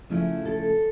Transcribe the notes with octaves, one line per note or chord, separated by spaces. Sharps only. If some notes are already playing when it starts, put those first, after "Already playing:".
C#3 F3 A3 C#4 E4
A4